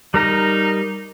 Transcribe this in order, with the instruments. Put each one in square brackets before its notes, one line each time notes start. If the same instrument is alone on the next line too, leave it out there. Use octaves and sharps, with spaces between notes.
[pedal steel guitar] G3 A#4 A#5 [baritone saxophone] D#4